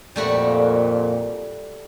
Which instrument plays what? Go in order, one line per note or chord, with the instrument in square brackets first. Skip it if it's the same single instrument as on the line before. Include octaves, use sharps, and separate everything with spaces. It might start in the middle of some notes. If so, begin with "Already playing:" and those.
[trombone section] F2 A#2 [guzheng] G3 A3 F#4